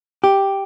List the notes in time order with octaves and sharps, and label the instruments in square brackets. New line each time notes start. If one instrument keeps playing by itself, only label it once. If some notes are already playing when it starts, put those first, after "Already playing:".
[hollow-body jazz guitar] G4